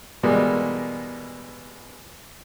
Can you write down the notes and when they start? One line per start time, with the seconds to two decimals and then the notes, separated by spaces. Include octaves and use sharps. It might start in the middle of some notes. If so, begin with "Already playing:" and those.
0.23 B2 E3 G3 G#3 A#3